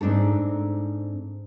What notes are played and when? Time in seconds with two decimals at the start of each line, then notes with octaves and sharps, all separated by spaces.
0.01 G#2 C4 D4 D#4 A4